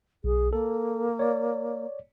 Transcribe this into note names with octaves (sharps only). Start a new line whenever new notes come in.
B1 G#4
A#3 A4
C#5 D5